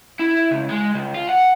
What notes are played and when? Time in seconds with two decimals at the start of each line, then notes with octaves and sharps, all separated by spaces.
0.20 E4
0.52 C#2
0.71 G#3
0.94 C#2
1.14 F4
1.29 F#5